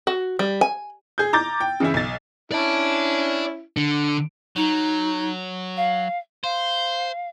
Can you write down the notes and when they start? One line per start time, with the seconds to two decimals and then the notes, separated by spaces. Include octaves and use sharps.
0.07 F#4
0.39 G3
0.61 G#5
1.18 G#4 G6
1.33 A#5 D6 G6 A6
1.60 G5
1.80 C#3 E3 E4
1.94 B1 A6
2.52 C#4 E4 D5 A5
3.77 D3
4.56 F#3 D#4
5.77 F5
6.44 C5 F5